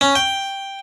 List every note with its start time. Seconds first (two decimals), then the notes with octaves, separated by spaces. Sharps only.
0.01 C#4
0.15 G5